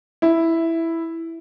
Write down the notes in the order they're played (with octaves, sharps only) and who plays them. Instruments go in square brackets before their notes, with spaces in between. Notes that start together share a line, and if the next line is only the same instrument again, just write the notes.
[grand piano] E4